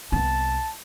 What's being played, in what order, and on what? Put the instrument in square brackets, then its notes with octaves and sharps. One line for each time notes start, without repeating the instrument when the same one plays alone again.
[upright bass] C2 B3 [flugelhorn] A5